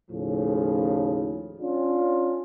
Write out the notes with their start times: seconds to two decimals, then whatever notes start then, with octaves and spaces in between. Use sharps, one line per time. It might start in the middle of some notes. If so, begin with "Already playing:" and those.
0.11 D#2 A2 C#3 F3
1.60 C#4 D4 F4